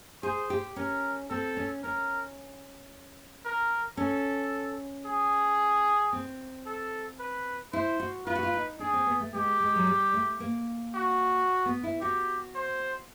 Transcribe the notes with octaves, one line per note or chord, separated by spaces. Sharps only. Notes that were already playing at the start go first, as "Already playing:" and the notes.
G#4 C5
G4
C#4 A#4
C4 A4
C#4
C#4 A#4
A#4
C#4 A4
G#4
C4
A4
B4
E4 C5
F#4
F4 B4
F#4
F4
D#4
D4 G#4
C4
B3
A3
G#3 G4
G#3
F#3
G3
A3
A#3
F#4
B3
E4
F#4 G4
C5